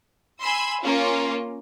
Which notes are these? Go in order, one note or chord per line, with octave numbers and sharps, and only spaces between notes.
G#5 B5 C6 E6
A#3 C#4 F4